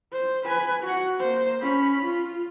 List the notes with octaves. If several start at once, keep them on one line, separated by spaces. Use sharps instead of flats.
C5
B4 G#5
F#4 F#5
A#3 C5
C#4 B5
F4